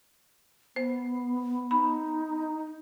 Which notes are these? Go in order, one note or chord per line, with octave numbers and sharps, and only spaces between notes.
B3 C5
D#4 B5